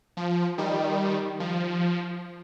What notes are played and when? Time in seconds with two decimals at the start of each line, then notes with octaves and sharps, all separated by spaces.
0.17 F3
0.58 D#3 G3
1.40 F3